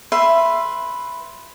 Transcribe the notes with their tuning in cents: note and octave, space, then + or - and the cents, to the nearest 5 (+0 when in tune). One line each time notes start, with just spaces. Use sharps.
B4 +0 E5 +15 C6 +0